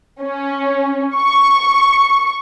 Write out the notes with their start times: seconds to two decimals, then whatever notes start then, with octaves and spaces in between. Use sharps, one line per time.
0.22 C#4
1.16 C#6